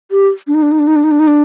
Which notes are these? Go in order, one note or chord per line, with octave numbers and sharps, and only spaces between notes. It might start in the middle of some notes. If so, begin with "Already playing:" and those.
G4
D4
D#4
D4
D#4
D4
D#4
D4
D#4
D4
D#4
D4